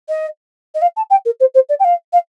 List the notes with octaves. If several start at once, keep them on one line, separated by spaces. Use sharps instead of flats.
D#5
D#5
F5
A5
G5
A#4
C5
C5
D5
G5
F5
F5